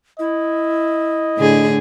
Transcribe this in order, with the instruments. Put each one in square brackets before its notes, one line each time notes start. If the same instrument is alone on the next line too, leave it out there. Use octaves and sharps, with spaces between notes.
[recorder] E4 [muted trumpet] D#5
[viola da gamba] A2 D3 G#4